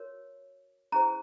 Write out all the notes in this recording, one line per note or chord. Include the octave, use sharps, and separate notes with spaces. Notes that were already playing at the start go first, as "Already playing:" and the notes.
Already playing: F#4 A#4 C#5
C#4 E4 G#4 C5 A#5